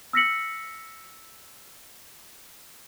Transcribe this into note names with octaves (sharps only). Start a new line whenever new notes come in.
E6 F6 A#6 B6 C#7 F#7